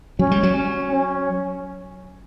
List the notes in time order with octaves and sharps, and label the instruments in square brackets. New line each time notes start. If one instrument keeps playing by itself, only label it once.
[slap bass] F#3 [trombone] C#4
[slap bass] G3
F#3
[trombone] C#4
C#4